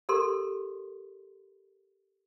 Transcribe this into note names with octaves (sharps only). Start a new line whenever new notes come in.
G4 A4 A#4 C6